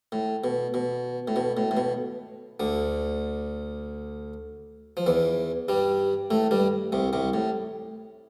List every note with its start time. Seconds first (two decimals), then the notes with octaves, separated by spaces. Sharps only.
0.12 A2
0.44 B2
0.74 B2
1.28 A2
1.36 B2
1.57 A2
1.71 A2
1.77 B2
2.60 D2 D3
4.97 F3
5.06 E2 E3
5.69 G2 G3
6.31 A2 A3
6.51 G2 G3
6.92 C2 C3
7.13 C2 C3
7.34 A2